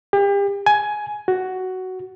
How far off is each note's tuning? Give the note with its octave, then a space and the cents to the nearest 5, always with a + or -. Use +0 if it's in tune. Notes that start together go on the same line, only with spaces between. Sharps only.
G4 +35
G#5 +15
F#4 +10